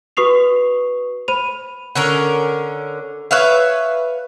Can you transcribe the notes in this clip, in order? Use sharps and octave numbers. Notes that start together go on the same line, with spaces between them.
F#4 B4 C#6 D#6 C7 F7
C5 B5 D#7 F7
D3 C#4 A#4
B4 C#5 E5 F5